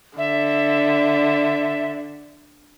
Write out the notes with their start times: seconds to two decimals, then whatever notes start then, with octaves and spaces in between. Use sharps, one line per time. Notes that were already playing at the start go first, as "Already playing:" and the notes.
0.18 D3 E5